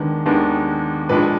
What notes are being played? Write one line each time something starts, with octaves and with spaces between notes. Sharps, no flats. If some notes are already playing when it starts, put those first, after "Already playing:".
Already playing: D#2 D#3 G#3 B3 D4
D#2 D#3 G#3 B3 D4
A#1 A#2 G#3 D4 B4